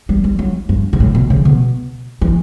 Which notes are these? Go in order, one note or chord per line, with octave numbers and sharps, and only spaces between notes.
G3
G3
F#3
G2
B2
A2
B2
C#3
B2
E3